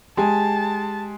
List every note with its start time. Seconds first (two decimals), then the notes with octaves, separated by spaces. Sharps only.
0.17 G#3 G4 G#5 A5